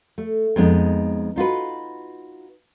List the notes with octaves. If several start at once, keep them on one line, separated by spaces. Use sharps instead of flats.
A3
F2 G#3 B3 D#4
D#4 F4 F#4 B4